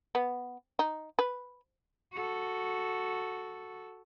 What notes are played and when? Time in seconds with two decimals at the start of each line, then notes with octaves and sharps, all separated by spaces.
0.15 B3
0.79 D#4
1.19 B4
2.13 F#4 A4